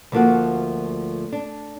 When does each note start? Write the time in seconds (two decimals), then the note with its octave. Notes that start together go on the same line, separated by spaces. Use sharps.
0.12 D2 F3 A3 A#3 F4 F#4
1.32 D4